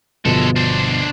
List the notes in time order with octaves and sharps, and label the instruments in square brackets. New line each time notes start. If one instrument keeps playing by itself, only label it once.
[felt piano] G1 B2 F3 [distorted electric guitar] G#3 A4
[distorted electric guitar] D4 C5